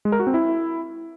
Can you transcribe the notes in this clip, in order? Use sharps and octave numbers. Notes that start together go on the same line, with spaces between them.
G#3
A#4
F#4
C4
E4